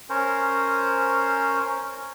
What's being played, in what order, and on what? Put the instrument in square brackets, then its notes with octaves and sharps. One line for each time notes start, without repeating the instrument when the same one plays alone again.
[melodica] C#4 A#4 C5